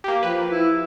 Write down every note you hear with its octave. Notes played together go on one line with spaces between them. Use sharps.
A#3 G4
F3 B4
E4